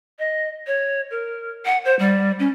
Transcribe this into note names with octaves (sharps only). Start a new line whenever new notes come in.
D#5
C#5
A#4
F#5
C5
G3
C#4